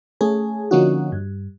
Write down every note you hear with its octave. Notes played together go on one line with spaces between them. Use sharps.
A3 C#4 G#4
D3 F3 A#3 C#4 D#4 F#4
G2